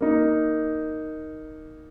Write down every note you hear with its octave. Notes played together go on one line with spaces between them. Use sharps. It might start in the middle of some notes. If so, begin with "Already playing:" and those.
A#3 D#4